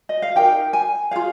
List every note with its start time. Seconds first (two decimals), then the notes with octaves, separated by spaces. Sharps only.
0.09 D#5
0.22 F5
0.36 D#4 G4 A#4 G5
0.73 G#5
1.11 F4 G#4 F5